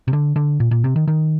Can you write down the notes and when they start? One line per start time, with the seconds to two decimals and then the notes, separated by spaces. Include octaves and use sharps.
0.08 C3
0.13 D3
0.36 D3
0.60 A#2
0.71 A#2
0.84 C3
0.96 D#3
1.08 D#3